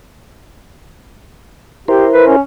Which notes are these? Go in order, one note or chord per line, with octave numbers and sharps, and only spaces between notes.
E4 G4 A#4 C5
B4
C#4